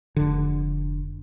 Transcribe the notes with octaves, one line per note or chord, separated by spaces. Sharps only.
F1 D3